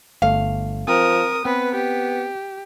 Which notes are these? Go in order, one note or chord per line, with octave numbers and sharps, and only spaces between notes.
G1 A3 F5
F3 C4 A#4 D#6
B3 C4 B4
G4